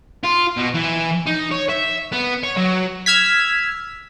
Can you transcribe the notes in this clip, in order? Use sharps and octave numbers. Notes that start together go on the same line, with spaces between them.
F4
B2
E3
D#4
C#5
E5
B3
C#5
F#3
E6 F6 G#6 B6